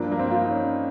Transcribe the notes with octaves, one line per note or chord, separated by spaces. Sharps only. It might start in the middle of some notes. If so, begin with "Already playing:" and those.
Already playing: G2 F3 A#3
A#3
C4
F4
D#4
C#4